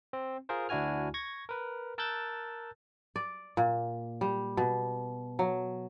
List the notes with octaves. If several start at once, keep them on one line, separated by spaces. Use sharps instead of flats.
C4
F4 G#4 A#4 C5
D2 D4 E4 F#4 G#5 F6
C#6 G#6 A#6
A#4 B4
A#4 A5 E6 F#6 G6 A6
D5
A#2
G3
B2
F#3